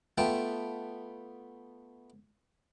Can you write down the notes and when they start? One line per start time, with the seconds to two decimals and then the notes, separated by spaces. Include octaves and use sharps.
0.18 A3 B3 F4 G5 A5